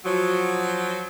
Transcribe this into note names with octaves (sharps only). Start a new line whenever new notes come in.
F3 F#3